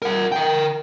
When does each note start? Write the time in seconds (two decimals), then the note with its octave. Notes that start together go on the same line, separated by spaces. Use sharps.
0.02 A#4 F#5
0.32 A#4 G5